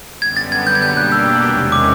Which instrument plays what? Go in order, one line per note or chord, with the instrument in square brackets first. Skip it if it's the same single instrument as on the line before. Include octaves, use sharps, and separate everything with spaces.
[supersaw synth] F#2 D3 G3 B3 [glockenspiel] G#6
[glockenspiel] A6
G#6
G6
G#6
[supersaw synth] B2 G3 A#3 D4 G4 [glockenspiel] G6
[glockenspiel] F#6
E6
[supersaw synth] E2 C3 D#3 G#3 C#4
[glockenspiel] D6